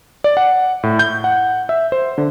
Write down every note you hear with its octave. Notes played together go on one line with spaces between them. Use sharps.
D5
F#5
A2
G6
F#5
E5
C5
D3